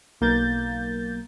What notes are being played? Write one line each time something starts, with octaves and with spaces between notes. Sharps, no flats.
B1 A#3 G6 A6